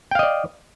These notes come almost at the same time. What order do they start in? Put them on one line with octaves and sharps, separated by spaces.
G5 F5 D#5 D5